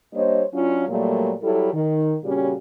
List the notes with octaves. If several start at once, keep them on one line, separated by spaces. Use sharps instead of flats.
G3 A#3 D4 C5 C#5 D#5
F#3 C#4 D4 F4
A#2 F#3 G3 A3 A#3
F#3 G3 E4 A4
D#3
A#2 C#3 G3 C#4 F#4 G4